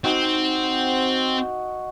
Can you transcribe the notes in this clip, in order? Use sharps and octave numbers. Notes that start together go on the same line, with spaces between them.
C4 D#4 F#4